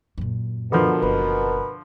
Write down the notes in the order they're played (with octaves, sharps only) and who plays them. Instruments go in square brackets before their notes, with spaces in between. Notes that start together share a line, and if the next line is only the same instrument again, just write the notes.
[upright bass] F#2 A#2
[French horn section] B2 A#4 [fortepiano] D3 F3 [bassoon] B3
[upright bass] F#1 [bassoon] B4